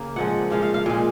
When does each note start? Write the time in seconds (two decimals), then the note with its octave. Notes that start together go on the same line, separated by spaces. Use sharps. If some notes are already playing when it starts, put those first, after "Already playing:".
Already playing: C#3 A#3
0.16 A#2 F3 G#3 F#5
0.51 A#2 F3 G#3 F5
0.63 F5
0.74 F5
0.86 A#2 G#3